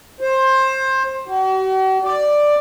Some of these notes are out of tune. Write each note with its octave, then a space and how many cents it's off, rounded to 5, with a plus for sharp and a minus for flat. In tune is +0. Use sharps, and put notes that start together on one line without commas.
C5 +20
F#4 +45
D5 +5